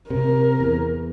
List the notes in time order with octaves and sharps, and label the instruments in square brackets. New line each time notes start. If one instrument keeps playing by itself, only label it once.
[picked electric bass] C3 [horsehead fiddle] A#4
[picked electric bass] E2